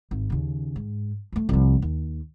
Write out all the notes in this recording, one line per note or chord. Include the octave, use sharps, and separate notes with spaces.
G#1
D#2 C#3
G#2
F3 A3
C2 F3
D#2